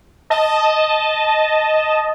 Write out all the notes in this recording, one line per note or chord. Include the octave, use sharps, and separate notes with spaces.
D#5 A5